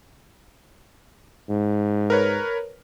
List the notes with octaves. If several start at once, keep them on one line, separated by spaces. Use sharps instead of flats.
G#2
A#4 B4 C#5